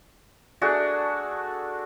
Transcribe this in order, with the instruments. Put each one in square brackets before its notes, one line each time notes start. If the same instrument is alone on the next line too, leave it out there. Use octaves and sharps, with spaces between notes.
[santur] A3 D4 F#4 G#4